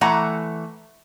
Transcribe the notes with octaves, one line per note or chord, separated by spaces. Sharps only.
E3 A3 F#5 A#5